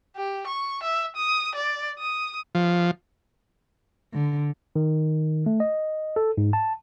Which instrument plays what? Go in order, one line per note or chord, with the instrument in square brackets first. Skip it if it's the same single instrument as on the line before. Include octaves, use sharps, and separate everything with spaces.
[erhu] G4
C#6
E5
D#6
D5
D#6
[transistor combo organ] F3
[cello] D3
[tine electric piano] D#3
A3
D#5
A4
G#2
A5